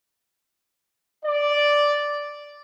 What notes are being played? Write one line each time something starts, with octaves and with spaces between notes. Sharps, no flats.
D5